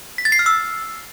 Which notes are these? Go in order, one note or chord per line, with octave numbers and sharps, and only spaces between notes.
B6
A6
C7
F6
E6